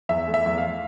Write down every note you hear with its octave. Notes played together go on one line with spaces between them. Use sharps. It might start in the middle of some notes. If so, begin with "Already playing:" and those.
E2 E5
A3
E5
E2
F5